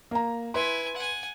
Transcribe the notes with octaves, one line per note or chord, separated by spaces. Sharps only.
A#3 A#5
E4 B4 G#5 C6
F#5 G#5